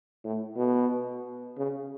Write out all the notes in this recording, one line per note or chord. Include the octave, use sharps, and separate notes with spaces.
A2
B2
C#3